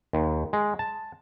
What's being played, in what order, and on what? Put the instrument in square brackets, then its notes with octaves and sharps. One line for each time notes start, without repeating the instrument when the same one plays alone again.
[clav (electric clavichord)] D#2
G#3
A5